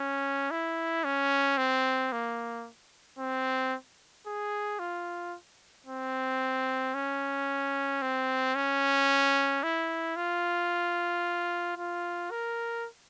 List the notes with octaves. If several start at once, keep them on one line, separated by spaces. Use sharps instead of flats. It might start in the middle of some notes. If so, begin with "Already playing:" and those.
Already playing: C#4
E4
C#4
C4
A#3
C4
G#4
F4
C4
C#4
C4
C#4
E4
F4
F4
A#4